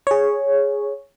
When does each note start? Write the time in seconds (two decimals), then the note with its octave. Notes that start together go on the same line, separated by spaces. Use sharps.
0.07 G#4 C#5